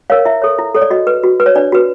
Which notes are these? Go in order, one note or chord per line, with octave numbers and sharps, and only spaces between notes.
A#4 C#5 F5
E4 E5
A4 C#5
E4
A4 C#5
D5
F#4 D#5
B4
F#4
B4
C#5
D4 D5
F#4 B4